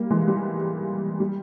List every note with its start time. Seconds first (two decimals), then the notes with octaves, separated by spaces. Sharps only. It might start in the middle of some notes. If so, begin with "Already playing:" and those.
Already playing: G3 A#3
0.10 E3 G#3
0.28 G3
1.20 G3